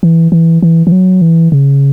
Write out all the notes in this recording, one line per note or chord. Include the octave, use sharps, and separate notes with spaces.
E3
E3
E3
E3
F#3
E3
C#3